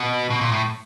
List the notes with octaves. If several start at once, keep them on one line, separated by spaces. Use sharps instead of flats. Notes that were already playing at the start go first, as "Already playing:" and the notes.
Already playing: B2
B2
A#2
A2